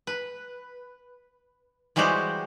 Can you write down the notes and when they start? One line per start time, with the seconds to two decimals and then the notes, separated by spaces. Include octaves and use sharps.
0.07 B4
1.96 E3 G3 G#3 F#4 G4 C5